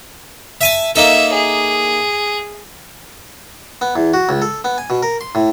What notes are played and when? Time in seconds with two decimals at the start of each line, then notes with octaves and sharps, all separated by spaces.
0.61 E5 G#5 A5
0.96 A#3 D#4 A4 E5
1.33 G#4
3.82 B3
3.96 E2
4.14 F#4
4.29 C#2
4.42 A4
4.65 B3
4.78 G#5
4.90 B2
5.03 A#4
5.21 C6
5.35 A2